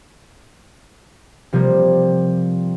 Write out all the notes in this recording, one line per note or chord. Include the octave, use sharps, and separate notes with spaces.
C3 F3 G3 A#3